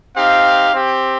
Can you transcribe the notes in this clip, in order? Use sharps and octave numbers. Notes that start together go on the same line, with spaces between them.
C4 D#4 G4 F5
C4 G4